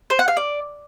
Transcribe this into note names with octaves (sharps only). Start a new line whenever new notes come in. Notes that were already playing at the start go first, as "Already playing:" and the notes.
C5
F#5
F5
D5